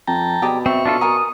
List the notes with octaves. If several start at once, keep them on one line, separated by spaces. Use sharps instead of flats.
F2 G5 A5 A#5
B2 G4 G#4 D5
C4 E5 C#6
D4 F4 A4
A#4 G#5 A#5 D#6